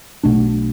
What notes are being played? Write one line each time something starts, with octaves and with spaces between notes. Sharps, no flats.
B1 B2 A3 D4